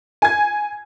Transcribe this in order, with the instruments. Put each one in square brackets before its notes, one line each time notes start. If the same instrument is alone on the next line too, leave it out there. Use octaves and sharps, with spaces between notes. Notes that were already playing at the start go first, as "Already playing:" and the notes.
[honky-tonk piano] G#5 G#6